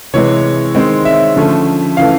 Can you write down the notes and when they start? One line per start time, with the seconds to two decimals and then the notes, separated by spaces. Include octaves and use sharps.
0.14 C3 E3 G#3 C#5
0.75 D#3 G#3 C4
1.05 E5
1.36 D3 F3 A3 C#4
1.97 C#3 E3 A3 F5